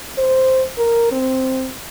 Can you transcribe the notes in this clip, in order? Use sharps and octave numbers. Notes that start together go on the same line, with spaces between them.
C5
A#4
C4